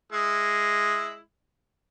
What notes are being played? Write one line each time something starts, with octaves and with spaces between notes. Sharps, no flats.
G#3 E4